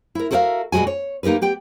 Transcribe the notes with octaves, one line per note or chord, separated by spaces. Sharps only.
E4 A#4
F#4 A4 A#4 C#5 E5 F5
B2 G3 G#3 F#4 G#5
C#5
A#3 D#4 G4 A#4 B4
B3 G4 G5